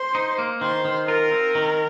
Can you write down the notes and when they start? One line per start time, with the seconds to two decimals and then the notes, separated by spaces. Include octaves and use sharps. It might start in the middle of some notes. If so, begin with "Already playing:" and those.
Already playing: C5
0.15 D#4
0.38 A#3
0.61 D#3 C5
0.85 D#3
1.08 F4 A#4
1.31 C4
1.55 D#3